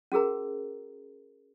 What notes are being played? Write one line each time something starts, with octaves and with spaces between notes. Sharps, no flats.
C#4 F#4 G#4 A#4 A#5